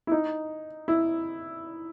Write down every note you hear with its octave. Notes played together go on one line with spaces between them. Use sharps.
E4
D#4
E4